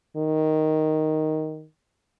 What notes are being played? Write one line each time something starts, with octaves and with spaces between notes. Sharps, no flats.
D#3